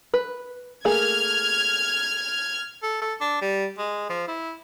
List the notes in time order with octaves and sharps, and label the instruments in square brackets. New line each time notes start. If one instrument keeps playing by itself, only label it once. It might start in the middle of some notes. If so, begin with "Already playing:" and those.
[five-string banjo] B4
[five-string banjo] A3 A#3 G#4 [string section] F6 G#6
[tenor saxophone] A4
A4
D4
G3
G#3
F3
E4